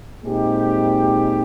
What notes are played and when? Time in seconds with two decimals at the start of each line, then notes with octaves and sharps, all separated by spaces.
0.23 A#2 G#3 C4 D#4 G4